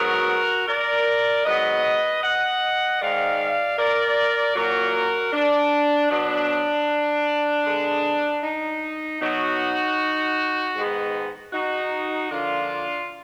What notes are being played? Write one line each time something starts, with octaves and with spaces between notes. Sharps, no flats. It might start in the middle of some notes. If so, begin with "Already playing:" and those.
Already playing: G#2 F#3 B3 F#4 A#4
A#4 D5
G#2 F#3 B3 B4 D#5
D#5 F#5
G#2 D#3 G#3 D5 F5
A#4 D5
A#2 F#3 A#3 F#4 A#4
D4
B2 F#3 B3 D4
D3 G#3 B3
D#4
B2 F#3 B3 D#4 F#4
G#2 D#3 G#3 B3
D#4 F#4
D3 F3 A#3 D4 F4